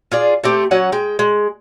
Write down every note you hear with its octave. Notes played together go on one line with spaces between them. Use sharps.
F4 G#4 D5
A3 C4 G4
F#3 C#4 F#5
G#3 G5
G#3